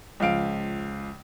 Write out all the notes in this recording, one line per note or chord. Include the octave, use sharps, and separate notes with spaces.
C#2 F3 F5 D7